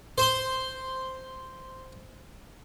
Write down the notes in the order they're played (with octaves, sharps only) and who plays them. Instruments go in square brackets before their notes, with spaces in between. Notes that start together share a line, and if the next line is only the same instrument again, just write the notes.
[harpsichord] C5 C6